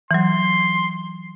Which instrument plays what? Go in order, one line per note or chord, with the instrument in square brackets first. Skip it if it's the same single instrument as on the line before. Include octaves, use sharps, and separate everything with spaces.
[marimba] E3 F#3 [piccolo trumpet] C6